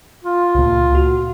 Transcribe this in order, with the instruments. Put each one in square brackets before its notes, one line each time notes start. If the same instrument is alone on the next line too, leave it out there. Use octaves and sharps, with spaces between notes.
[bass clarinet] F4
[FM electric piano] C#2 A#2
F#4